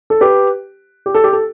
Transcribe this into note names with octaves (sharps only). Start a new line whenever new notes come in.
A4
G4 B4
G4
A4
G4
A4